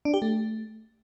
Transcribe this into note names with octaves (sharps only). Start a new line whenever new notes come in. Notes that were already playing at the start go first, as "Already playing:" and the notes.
D4
G4
A3